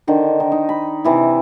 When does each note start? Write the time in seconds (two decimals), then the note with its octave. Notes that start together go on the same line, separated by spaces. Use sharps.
0.07 D3 D#3 C5
0.40 D#3
0.52 D#4
0.69 B5
1.04 C3 E3 E4